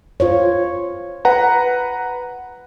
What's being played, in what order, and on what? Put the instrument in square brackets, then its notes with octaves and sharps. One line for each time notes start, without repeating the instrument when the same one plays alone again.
[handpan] F4 C5 C#5
[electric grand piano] B4 F#5 A#5